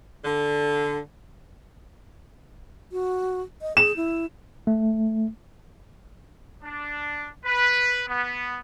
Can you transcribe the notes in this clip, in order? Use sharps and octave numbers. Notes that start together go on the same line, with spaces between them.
D3
F#4
D#5
G#4 E7
E4
A3
D4
B4
B3